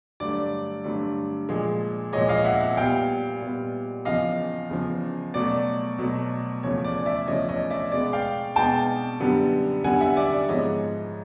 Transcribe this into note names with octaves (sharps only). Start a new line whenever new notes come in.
G2 D3 F#3 A3 D5
G2 D3 F#3 A3
A#2 F3 G#3
A#2 F3 G#3 C#5 D#5
D#5 F5
E5 F#5
E5 F#5
A#2 G3 B3 F5 G5
A#2 G3 B3
E2 C#3 F3 D#5 F5
E2 C#3 F3
B2 F#3 A3 D5
B2 F#3 A3
E2 C#3 F3 A3 C#5
D5
D5 E5
E2 C#3 F3 A3 C#5 D#5
C#5 D#5
D5 E5
B2 G#3 B3 D5
F5 G5
B2 G#3 B3 G5 A5
F#2 D3 G3 B3
F#2 D3 G3 B3 F#5 G#5
E5 F#5
D5 E5
D5
G#2 F3 G#3 B3 C#5 D#5